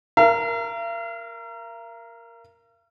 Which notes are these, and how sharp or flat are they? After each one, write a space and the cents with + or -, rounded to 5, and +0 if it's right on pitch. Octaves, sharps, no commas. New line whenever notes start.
A#4 +0 F5 -45